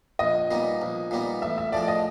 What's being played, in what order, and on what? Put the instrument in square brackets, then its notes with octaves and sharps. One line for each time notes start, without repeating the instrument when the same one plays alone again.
[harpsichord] A#1 [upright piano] D#5
[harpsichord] A#2 G3 B3 D#4
A#1
A#2 G3 B3 D#4
[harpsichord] A1 [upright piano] E5
[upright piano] E5
[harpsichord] A2 F3 G#3 [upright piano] D5
[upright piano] D#5